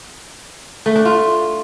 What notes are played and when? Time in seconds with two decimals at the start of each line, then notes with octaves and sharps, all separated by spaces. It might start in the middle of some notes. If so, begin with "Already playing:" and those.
0.86 A3
0.96 D4
1.05 F4